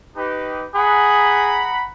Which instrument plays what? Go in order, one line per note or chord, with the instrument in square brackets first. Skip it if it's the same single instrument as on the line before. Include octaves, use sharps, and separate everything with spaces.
[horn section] D#4 G4 B4
[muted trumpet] G#4 [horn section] F#5 A#5 B5